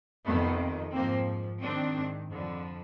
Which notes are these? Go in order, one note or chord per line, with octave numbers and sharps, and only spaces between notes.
F2 C3 D#3 A3 B3
G#2 F3 A#3 C4
G#2 D#3 C4 D4
F2 D3 F3